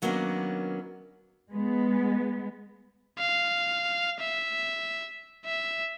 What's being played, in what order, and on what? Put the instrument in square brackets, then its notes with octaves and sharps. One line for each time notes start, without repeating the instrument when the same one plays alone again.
[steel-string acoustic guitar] D#3 F#3 A#3 B3 C#4 D4
[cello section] G#3 B3
[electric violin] F5
E5
E5